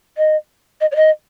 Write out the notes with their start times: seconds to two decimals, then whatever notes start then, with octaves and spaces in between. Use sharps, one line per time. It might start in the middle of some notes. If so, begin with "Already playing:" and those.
0.17 D#5
0.80 D#5
0.91 C#5
0.95 D#5